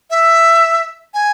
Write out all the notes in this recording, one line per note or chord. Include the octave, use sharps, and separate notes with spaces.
E5
G#5